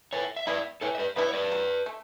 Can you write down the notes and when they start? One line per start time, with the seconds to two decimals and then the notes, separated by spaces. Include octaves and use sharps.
0.12 E3 C#5 E5
0.36 E5
0.47 B3 E4 B4 D5
0.81 E3 A4 C#5
0.95 E5
0.99 B4 D5
1.16 B3 E4 B4 D5
1.29 C#5
1.34 B4 D5
1.52 F#3
1.86 A3